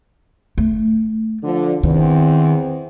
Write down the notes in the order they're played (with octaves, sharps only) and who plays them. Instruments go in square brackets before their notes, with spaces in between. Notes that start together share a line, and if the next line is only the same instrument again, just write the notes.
[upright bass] A3
[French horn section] D3 F3
[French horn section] E2 C4 [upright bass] D#3